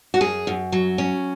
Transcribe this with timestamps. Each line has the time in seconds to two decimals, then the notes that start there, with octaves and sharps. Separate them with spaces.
0.14 F#4
0.21 F#2 G#4
0.47 F#2
0.72 F#3
0.98 C#4